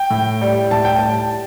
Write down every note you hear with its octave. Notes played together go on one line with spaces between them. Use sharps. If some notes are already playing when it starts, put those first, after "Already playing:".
Already playing: G5
A2
G3
A2 A5
G5
G3 A5